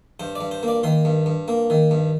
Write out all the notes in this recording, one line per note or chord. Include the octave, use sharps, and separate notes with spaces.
G2 C5
D5
G2
C5
A#3
D5
D#3 C6
G2
G2
A#3
D#3
G2